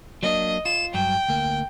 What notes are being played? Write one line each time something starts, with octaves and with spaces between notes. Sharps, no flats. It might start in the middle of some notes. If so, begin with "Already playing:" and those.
F#3 A#3 D4 D#5
F4 E7
G2 F#3 G5
D2 A#3